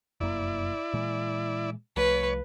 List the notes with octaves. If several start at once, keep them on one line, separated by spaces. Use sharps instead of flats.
F1 F#2 A#3 E4 D5
A#2 E3 G#3
C2 F3 A3 B4 C#5